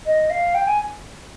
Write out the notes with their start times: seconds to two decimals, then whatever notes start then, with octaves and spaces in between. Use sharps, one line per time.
0.06 D#5
0.30 F5
0.55 G5
0.67 G#5